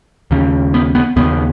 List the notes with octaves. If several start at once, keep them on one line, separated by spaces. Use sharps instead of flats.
D#2 C#3
B3
B3
D#2 C#3 B3